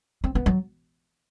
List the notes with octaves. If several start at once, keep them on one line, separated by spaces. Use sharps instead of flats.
C4
B3
F#3